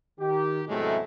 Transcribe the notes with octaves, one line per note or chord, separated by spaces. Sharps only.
D#3 G4
E2 A2 C3 F#3 G#3 A3